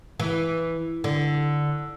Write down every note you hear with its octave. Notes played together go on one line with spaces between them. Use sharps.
E3
D3